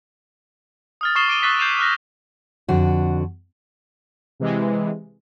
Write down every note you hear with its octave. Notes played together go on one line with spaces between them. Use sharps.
D#6 F6 A6
C#6 D#6 A6 C7 E7 G7
D6 D7 D#7 G7
C#6 E6 F#6 A6 B6 C7
G6 C7 E7 F7
F6 F#6 A#6
F2 D3 F#4
C3 E3 G#3